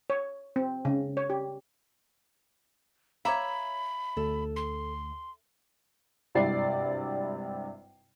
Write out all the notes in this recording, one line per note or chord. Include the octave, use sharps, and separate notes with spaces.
C#5
C4
C#3
C#5
G4
C#5 E5 F5 A#5 B5 D6
D2 A4
C6
G#1 G2 C3 E4 D5 C7